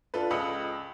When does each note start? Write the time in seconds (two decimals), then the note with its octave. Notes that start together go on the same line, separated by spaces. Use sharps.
0.14 D4 F4 A4 B4
0.31 C#2 D#5 B5 D#6 C#7